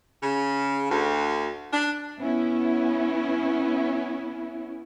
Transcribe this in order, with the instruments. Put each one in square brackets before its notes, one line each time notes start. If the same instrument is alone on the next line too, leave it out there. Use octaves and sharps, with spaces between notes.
[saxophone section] C#3
D2
D4
[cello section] B3 C#4 E4